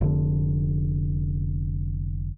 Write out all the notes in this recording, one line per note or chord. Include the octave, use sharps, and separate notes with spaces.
F1 D3